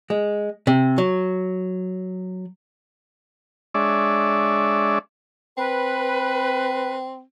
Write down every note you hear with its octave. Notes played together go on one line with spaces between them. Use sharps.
G#3
C3
F#3
G#3 D4 C#5 D5 E5
C4 B4